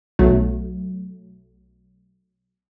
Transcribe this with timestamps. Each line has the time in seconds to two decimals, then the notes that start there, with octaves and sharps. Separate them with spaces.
0.19 B1 F#3 A3